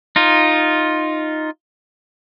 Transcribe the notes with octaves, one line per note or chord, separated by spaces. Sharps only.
D#4 F4